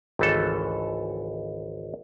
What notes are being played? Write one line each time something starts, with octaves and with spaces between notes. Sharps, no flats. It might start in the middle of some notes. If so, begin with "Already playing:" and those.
G#1 C#2 E3 A3 A4